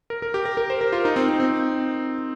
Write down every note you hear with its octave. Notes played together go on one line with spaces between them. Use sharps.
A#4
A#4
G4
A#4
A#4
C5
A#4
F4
D#4
C4
C4
C4